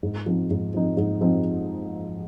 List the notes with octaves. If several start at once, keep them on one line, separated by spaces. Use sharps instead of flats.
G#2
F3 C4 D#4
G#2
F3 C4 D#4
G#2
F3 C4 D#4